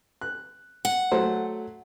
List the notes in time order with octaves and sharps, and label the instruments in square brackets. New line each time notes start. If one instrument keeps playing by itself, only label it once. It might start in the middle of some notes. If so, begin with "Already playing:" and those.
[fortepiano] F#6
[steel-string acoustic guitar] F#5
[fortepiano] F#3 A3 C5